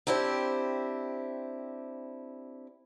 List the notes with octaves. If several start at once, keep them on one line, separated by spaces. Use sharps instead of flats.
C4 D4 E4 G4 C5